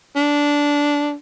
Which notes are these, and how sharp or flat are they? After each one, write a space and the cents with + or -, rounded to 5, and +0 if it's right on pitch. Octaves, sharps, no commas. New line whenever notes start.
D4 -10